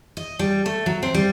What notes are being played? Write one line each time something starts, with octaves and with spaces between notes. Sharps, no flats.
D#5
G3
A3
F#3
C4
G3